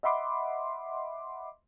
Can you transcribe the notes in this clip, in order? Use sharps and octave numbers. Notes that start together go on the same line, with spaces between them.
D#5 E5 F#5 B5 C6 D6